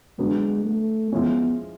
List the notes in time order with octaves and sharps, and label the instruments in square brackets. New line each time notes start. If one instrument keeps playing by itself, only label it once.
[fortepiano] D3 F#3 B3 [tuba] G#3
[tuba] A3
[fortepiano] F3 G#3 C#4 E4 [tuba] B3